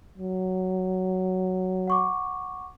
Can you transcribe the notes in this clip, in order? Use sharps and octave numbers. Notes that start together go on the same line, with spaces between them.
F#3
F#5 C#6 D6